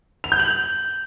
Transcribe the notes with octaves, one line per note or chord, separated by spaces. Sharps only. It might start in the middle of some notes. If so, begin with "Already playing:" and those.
F7
G6
F#7